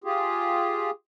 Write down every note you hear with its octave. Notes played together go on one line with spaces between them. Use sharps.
F4 G4 G#4